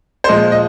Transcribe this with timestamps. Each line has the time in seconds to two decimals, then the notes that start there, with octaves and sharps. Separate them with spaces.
0.24 C5
0.29 A#2 F3 G#3 D#5
0.52 D#5